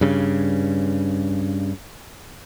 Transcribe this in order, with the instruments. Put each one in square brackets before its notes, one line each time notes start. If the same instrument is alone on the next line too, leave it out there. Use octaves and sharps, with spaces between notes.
[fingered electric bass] G2 C#3